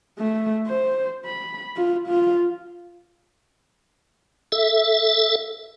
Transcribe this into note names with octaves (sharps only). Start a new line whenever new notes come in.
A3
C5
B5
F4
F4
A4 E5